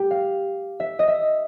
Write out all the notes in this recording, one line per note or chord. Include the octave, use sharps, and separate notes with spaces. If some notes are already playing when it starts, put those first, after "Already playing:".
Already playing: G4
F5
E5
D#5
E5